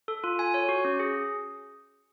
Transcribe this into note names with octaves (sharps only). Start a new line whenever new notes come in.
A4
F4
G#5
C#5
F#4
C#4
G#4